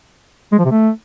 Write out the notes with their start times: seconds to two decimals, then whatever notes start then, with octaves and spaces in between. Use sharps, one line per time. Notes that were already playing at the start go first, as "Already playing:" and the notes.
0.52 G#3
0.59 F3
0.65 C3
0.71 A3